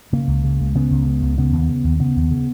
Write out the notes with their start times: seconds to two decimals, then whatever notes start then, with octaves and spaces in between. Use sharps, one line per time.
0.13 C#3 A#3
0.27 C#2
0.44 C#3
0.60 C#2
0.75 C#3 B3
0.91 C#2
1.06 C#3
1.22 C#2
1.38 C#3 B3
1.53 D#2
1.69 C#3
1.84 D#2
2.00 C#3 B3
2.16 D#2
2.31 C#3